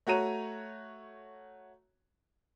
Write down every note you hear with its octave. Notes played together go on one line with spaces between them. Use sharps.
A3 F#4 C#5 A#5 D#7